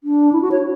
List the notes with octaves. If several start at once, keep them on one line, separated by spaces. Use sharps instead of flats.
D4
E4
F#4
C#5